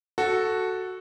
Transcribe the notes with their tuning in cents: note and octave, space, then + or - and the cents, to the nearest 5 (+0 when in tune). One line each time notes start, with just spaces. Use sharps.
F#4 +0 A4 +0